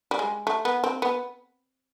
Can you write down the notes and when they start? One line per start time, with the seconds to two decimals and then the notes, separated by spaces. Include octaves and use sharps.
0.11 G3
0.19 G#3
0.47 A3
0.65 B3
0.84 C4
1.02 B3